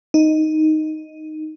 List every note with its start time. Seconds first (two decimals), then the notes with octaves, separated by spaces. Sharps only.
0.14 D#4